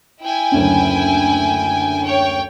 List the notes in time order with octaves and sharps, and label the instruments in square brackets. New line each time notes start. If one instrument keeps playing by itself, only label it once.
[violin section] E4 G5 G#5
[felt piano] F#1 D2 C#4
[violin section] C#5 G5